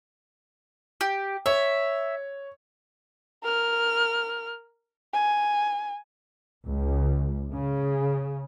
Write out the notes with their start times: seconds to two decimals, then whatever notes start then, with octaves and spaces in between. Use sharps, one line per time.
1.01 G4
1.46 C#5 E5
3.43 A#4 F6
5.13 G#5
6.65 C#2
7.53 C#3